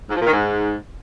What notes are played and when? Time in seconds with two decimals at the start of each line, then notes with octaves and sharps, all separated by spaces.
0.09 G#2
0.15 F3
0.21 A#2
0.27 D#3
0.32 G#2